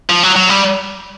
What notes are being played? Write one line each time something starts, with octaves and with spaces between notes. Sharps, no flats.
F3
F#3
F#3
G3